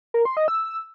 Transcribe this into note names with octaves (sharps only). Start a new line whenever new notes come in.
A#4
C6
D#5
E6